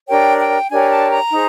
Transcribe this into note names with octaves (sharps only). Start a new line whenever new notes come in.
D4 G4 A#4 C#5 G5
G5
D4 G4 A#4 C#5 G#5
A5
A#5
D#4 G#4 C5